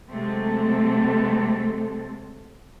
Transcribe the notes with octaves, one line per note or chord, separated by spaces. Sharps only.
C3 F#3 G#3 A3 C4 A4